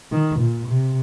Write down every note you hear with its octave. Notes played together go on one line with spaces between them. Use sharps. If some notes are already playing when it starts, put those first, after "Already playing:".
D#3
A#2
C3